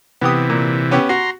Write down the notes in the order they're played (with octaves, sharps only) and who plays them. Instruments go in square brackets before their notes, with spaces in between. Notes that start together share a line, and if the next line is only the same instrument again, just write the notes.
[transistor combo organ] C3 E3 [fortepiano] B3 G4 D#6
[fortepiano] A#2
B3 C#4 G4
[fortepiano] F#4 [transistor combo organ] A#5 C6